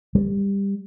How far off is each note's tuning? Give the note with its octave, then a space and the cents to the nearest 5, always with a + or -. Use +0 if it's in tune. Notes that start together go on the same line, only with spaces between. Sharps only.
G3 +20